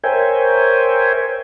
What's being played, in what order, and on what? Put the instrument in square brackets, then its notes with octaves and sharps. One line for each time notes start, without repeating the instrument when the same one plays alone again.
[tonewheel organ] A#4 C5 C#5 E5 G5 G#5